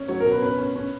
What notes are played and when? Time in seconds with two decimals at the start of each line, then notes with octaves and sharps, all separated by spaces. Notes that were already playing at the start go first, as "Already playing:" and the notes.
Already playing: C#4
0.08 F#3 C#5
0.20 A#4
0.26 B2
0.31 B4
0.42 C#4 B4
0.58 C#4
0.76 C#4